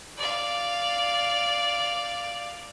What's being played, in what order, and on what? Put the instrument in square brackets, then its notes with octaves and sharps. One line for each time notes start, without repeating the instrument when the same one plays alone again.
[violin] D5 F5